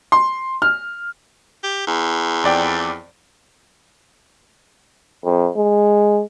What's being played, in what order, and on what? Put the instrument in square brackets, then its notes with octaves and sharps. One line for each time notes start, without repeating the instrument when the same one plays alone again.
[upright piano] C6
F6
[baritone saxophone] G4
E2
[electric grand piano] F2 D5 G5
[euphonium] F2
G#3